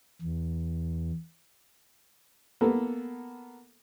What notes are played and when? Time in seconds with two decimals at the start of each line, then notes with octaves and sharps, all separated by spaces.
0.22 E2
2.61 A#3 B3 A4